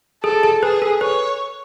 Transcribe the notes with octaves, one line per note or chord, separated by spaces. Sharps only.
G#4 A4
G#4
G#4 B4
A4
B4 C#5